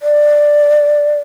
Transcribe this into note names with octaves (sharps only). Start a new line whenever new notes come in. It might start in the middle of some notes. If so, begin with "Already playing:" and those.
D5